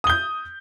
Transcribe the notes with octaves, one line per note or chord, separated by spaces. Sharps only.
D#6 G6 G7